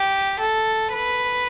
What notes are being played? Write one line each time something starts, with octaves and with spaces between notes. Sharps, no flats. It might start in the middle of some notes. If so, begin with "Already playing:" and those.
Already playing: G4
A4
B4